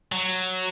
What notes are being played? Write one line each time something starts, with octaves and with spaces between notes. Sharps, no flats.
F#3